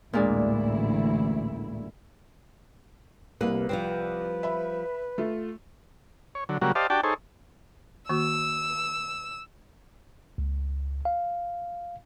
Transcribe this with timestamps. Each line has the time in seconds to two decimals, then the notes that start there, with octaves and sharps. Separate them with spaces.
0.13 A1 D2 A#2 G#3 D4 E4
3.41 C2 C3 A#3 B4
3.69 F3 G3 C4 B4
4.43 E5 B5
5.18 A3 F4
6.35 C#5
6.49 D3 F#3
6.62 C#3 F#3 G3 A#3 F#4
6.75 G4 C5 D5 D#5 F5 A5
6.90 D4 F#4 G4 D5 G5 A5
7.04 D#4 G#4 A4 C5 C#5
8.09 D#3 A#3 F#4 E6
10.38 C#2
11.05 F5